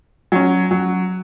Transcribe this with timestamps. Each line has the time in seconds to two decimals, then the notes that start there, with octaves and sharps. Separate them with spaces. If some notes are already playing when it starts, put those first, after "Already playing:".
0.32 F#3 C#4
0.71 F#3